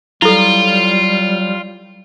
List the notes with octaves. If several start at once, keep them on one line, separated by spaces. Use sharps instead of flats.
F#3 G3 E4 F4 A4